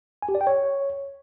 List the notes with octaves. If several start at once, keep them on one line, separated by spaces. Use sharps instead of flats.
G#5
G4
D5
G5
C#5